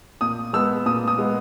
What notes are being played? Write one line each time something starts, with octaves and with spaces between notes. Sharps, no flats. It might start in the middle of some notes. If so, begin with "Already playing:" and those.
A#2 D#6
G#3 B3 E6
A#2 D#6
D#6
G#3 B3